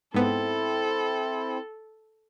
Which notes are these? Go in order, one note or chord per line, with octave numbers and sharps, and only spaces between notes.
G#2 B3 C4 E4 A4